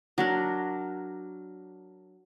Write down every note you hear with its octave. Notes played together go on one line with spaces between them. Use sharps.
F#3 D4 A#4